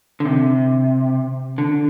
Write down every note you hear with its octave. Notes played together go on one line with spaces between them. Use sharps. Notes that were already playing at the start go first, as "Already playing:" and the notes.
D3
C3
D3